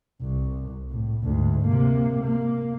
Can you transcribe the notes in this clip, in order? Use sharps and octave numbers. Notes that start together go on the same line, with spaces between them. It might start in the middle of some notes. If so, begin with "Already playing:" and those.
C2
A2
D2 G#2
C3 A#3
A#3